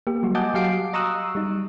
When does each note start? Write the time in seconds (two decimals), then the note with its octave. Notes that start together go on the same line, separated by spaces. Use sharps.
0.07 A#3 G4
0.23 F#3 G3 F#4
0.35 D#5 F#5 G#5 A5 D6 G6
0.54 F#3 F#4 G4 F5 C7 D7
0.93 D#5 A#5 C#6 D#6 E6 F#6
1.35 G3 D#4